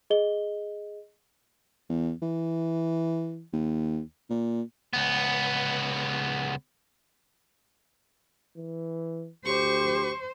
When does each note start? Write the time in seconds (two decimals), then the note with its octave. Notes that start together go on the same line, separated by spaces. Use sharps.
0.10 G#4 D#5 G7
1.90 E2
2.22 E3
3.53 D#2
4.30 A#2
4.93 C#2 B3
8.56 E3
9.45 D2 G4 C5 C#6